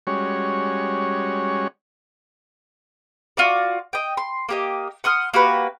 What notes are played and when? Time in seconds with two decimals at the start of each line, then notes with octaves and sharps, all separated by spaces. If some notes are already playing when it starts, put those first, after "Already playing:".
0.07 G3 G#3 C#4 F#4 C#5
3.37 F4 F#4 D5
3.93 D#5 G5
4.17 C6
4.49 A#3 G4 D#5
5.04 F#5 C6 D#6 F6
5.33 A#3 F#4 G4 B4